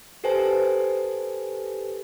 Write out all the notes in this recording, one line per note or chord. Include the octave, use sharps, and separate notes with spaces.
G4 A4 B4 C5 G#5 A5